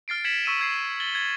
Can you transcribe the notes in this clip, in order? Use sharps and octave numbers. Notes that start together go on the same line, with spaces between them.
F6 A6 C7 D7
G#6 B6 C#7 D7 E7 F#7
C#6 E6 B6 D#7 E7
E6 G#6 C7
A6 F#7 G7
G#6 A6